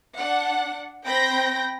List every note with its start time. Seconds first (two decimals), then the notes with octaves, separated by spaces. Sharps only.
0.17 D4 F#5
1.05 C4 G5 B5 G6 A#6